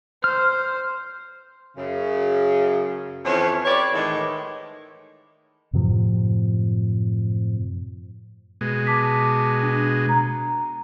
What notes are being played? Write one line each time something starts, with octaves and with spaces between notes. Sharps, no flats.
C5 F6
F#2 C#3
F2 E3 C#4 C5 C#5
G4 B4 C#5 D5
A2 D#3 E3 G#3
F#2 A2 C3 F3
B2 G#3
A5 D6 B6
D4
A#5